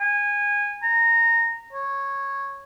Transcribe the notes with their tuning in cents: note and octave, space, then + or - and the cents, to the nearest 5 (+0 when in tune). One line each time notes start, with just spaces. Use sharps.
G#5 -20
A#5 -15
C#5 -10